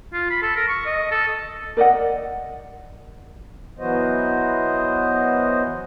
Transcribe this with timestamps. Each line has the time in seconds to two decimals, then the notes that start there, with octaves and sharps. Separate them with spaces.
0.13 F4
0.31 B5
0.42 A4
0.56 A#4
0.68 C#6
0.86 D#5
1.11 A4
1.77 A#4 D5 D#5 F#5
3.79 E3 F#3 B3 F#4 C5 D#5